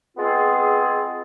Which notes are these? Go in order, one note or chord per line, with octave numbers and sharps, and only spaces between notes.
G#3 B3 C4 F4 G#4